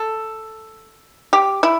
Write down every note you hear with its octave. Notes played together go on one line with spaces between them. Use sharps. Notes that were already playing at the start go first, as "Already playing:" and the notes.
Already playing: A4
G4
E4